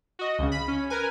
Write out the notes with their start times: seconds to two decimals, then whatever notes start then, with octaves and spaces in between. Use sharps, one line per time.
0.19 F#4 D#5
0.39 C#2 C#3
0.52 B5
0.68 C#4
0.90 A#4 B4 G#5